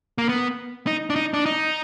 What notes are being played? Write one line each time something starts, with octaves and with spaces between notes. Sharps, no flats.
A#3
B3
D#4
D4
D#4
D4
D#4